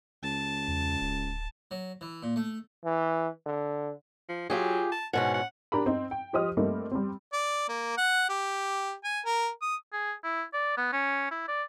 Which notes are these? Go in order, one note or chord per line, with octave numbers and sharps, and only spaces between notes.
C#2 A5
E2
D1
F#3
E3
A#2
A3
E3
D3
F3
F#3 F4 G4 G#4
A5
G#2 B2 C#4 F#5
F#5
D4 G4 A#4 A#5 B5
C4 D#4
G5
F3 G4 C5 D#5 D#6 F6
G3 A3 A#3 C4 D#4
G3 C4
D5
A#3
F#5
G4
G#5
A#4
D#6
G#4
E4
D5
B3
C#4
E4
D5